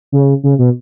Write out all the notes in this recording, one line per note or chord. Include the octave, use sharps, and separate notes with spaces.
C#3
C#3
B2